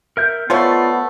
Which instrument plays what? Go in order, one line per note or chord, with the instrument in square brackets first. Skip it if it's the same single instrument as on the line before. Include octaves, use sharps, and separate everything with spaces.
[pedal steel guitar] A#4 E5 G6
[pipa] F3 A3 C#5 [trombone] B3 [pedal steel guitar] F4 D5